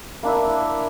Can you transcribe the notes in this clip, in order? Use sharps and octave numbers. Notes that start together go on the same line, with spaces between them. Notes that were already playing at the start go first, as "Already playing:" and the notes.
A#3 D4 E4 E5